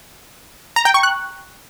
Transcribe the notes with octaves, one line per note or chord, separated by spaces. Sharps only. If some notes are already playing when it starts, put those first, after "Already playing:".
A#5
G5
C#6
F#6